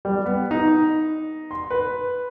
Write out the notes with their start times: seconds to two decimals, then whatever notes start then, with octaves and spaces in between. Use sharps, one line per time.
0.05 G3
0.26 B3
0.51 D#4
1.51 C6
1.71 B4